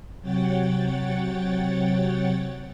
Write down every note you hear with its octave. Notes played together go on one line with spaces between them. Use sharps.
C3 F#3 C#5 F#5 G5 A6